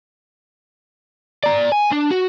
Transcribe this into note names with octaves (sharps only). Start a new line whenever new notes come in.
D5 A#5
G#5
D4
F#4